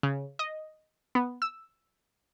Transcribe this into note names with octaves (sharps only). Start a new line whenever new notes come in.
C#3
D#5
B3
E6